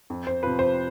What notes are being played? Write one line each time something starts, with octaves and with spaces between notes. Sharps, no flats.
F2
C5
C3 F3 B4
C5